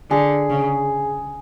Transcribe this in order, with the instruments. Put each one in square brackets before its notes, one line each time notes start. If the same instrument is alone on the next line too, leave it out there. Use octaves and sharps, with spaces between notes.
[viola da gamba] D3 [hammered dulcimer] G#4
[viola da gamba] C#3